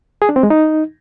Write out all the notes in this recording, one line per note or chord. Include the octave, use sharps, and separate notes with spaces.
G#4
D4
C4
G#3
D#4